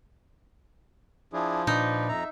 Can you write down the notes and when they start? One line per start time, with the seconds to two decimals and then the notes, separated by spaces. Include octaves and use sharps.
1.33 F3 D4 E4 G#4
1.67 A#2 D4 D#4 B4 D5
2.09 F2 E5 A#5